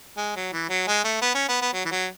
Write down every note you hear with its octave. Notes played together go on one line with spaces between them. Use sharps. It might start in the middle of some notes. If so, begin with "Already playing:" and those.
G#3
F#3
E3
F#3
G#3
A3
B3
C#4
B3
B3
F#3
E3
F#3